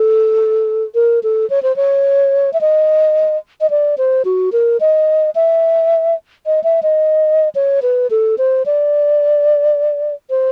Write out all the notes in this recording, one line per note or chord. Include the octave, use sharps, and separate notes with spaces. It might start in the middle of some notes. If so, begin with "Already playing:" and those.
Already playing: A4
A#4
A4
C#5
C5
C#5
E5
D#5
D#5
D5
C5
F#4
A#4
D#5
E5
D#5
E5
D#5
C#5
B4
A4
C5
D5
C5